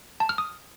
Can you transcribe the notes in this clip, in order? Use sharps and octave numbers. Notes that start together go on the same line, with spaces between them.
A5
F6
D#6